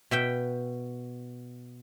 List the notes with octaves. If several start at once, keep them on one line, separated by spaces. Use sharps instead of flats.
B2 E5 G5